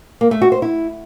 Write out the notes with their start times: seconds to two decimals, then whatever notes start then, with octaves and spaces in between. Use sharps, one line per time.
0.21 A#3
0.31 A3
0.42 F#4
0.52 C5
0.62 E4